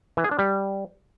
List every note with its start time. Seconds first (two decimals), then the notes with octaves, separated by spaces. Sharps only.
0.17 E3
0.24 G#4
0.31 D4
0.39 G3